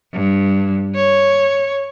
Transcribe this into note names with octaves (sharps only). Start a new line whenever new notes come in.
G2
C#5